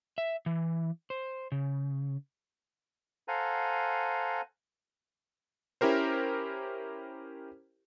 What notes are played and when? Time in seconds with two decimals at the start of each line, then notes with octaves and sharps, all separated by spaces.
0.18 E5
0.46 E3
1.10 C5
1.52 C#3
3.28 A4 C5 F5 F#5 G#5 A#5
5.81 C#4 E4 G4 A#4 C5